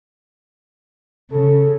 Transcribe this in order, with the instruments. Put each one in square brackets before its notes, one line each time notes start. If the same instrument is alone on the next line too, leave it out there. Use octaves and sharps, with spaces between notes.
[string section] C#3 [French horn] A4